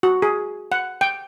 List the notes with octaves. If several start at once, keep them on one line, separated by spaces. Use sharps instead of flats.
F#4
G#4
F#5
G5